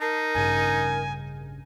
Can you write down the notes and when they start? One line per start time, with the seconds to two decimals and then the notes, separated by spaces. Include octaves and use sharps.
0.01 D#4 A#4 A5 C7
0.34 A1 G2 C#3 G#5